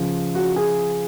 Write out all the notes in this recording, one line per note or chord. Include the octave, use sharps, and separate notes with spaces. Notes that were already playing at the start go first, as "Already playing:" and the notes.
Already playing: C#3 F3
F#4
G#4